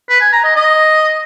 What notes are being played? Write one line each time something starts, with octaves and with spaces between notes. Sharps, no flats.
B4
G#5
A#5
D#5
D#5